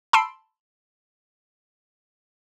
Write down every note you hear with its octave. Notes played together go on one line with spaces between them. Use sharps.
A5 B5 C6 E6 C7 D7